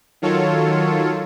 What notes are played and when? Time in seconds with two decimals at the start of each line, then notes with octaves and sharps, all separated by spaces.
0.22 D#3 F#3 F4 A4 C#5